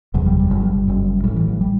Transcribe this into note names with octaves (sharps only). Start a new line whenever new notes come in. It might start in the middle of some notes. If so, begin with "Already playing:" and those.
F#1 E2 C3 F#3
G3
G3
G1 G2 F#3
G3
F#1 F#2
A1 A2 G3
E3
F#3
G3